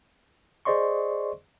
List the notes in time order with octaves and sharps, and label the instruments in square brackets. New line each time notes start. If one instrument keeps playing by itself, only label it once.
[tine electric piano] G#4 C5 D5 D#5 C6 C#6